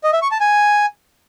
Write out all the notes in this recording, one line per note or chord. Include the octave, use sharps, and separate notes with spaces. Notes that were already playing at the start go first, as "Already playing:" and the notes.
D#5
E5
C#6
A5
G#5